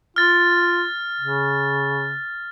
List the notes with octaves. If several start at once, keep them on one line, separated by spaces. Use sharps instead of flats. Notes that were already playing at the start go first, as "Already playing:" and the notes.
F4 F6 A6
C#3